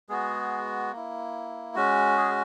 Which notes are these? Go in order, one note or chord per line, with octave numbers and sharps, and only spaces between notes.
G#3 B3 F#4 G#4
A#3 E4
G#3 C#4 F#4
G#4